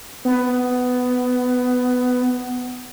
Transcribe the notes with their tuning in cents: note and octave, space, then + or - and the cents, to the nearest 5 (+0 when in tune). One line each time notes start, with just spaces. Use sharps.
B3 +15